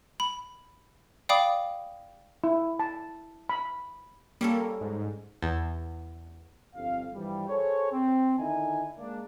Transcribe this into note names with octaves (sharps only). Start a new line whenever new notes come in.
B5
D5 F5 G5 B5 D6 D#6
E4
A5
B5
G3 A#3 C#4 A4
G#2
E2
G1 F2 F5
G2 E3 F3 G3
G#4 A4 C5 C#5
C4
D3 D#3 D#4 E4 G#5
G#3 A#3 D4